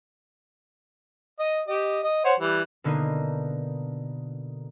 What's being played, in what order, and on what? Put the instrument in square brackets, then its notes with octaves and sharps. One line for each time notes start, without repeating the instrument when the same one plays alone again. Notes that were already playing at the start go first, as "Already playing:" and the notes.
[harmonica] D#5
G4 D#5
D#5
C5 C#5 F#5
E3 G3
[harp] B2 D3 A#3 B3 D#4